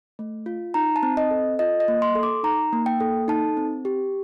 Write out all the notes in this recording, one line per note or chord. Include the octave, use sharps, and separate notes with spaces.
A3
F4
D#4 A#5
A5
C4
D#5
A4
F4 D#5
D#5
A#3
C6
A4
D6
D#4 A#5
A#3
G5
A4
D#4 A5
C4
G4